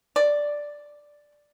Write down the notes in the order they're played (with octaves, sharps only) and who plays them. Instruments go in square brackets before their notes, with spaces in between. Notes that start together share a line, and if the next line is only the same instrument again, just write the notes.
[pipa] D5